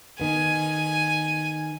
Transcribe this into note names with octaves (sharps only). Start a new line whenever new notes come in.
D#3 B3 G#5